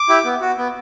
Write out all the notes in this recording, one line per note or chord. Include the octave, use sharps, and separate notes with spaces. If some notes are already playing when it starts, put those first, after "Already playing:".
Already playing: D6
E4 G4
B3
F#4
B3